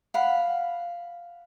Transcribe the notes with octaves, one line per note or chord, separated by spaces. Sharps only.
F5 F#5 B5